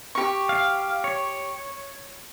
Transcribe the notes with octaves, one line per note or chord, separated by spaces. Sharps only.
G4 C#6
F5
C#5